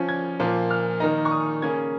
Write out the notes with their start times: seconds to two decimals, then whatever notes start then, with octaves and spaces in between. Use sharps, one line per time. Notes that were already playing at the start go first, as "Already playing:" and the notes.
Already playing: F3 C#4
0.09 G#6
0.40 A#2 F3 A#3
0.70 F6
1.00 D#3 A#3 D#4 A#5
1.25 C#6
1.31 D#6
1.62 C#3 A#3 C#4 G#6